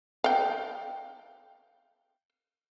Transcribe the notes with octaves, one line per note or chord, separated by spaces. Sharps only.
F5 G5